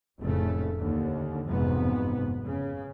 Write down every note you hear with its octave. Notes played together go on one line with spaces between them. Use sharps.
F1 A2 C#3 A3
D#2 D3
F#1 F2 G#2 C3 B3
C#3